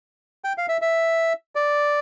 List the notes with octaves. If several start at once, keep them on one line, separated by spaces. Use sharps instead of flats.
G5
F5
E5
E5
D5